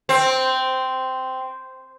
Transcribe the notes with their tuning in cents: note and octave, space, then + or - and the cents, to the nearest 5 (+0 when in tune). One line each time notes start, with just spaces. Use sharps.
C4 -10